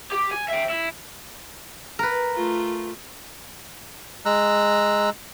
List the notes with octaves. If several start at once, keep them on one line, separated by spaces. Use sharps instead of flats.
G4
G#5
E5 G5
E4
A#4 B4
A3 F4
G#3 A#5 E6 F#6